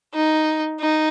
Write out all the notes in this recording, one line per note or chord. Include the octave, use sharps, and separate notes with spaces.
D#4
D#4